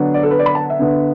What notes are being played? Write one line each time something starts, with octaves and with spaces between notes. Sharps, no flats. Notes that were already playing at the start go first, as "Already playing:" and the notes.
Already playing: D3 F#3 B3 D4
D5
A4
B4
D5
B5
A5
E5
D3 B3 D4